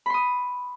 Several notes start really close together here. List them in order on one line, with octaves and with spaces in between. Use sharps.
B5 C6 D#6